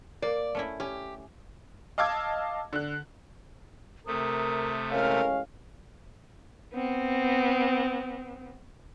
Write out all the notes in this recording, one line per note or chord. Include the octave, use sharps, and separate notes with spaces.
A#3 D5
A3 C#4 E4
C#4 G4
D#5 F5 A5 D6 E6 G#6
D3 F#6
C3 A3 A#4 D#6
A1 G#3 C#4 A#4 F5
B3 C4